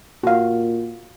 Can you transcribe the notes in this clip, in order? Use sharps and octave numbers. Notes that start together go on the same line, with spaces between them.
A#2 F#4 F5